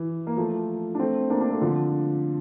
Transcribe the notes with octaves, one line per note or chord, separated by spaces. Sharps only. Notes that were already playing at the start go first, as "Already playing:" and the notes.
Already playing: E3
A#3
F3 A3
D4
A3 C4
A#3 D4
A#3 D4
A3 C4
D3 F3